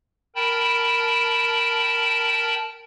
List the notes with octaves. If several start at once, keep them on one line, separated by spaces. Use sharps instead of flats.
A#4 G5 A5 B5